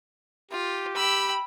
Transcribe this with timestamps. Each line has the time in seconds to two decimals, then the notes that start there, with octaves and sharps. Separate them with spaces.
0.52 F4 G4
0.96 G5 B5 E6